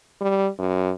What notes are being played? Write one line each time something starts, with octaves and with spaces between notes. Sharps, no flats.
G3
F#2